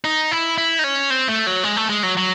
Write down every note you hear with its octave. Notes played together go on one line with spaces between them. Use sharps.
D#4
E4
E4
D#4
C#4
C4
A3
F#3
G#3
A3
G#3
F#3
F#3